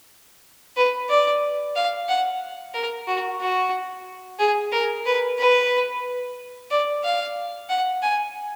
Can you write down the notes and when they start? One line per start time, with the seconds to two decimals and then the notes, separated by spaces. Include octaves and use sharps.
0.77 B4
1.09 D5
1.76 F5
2.09 F#5
2.74 A#4
3.08 F#4
3.41 F#4
4.39 G#4
4.72 A#4
5.06 B4
5.38 B4
6.71 D5
7.04 F5
7.69 F#5
8.02 G#5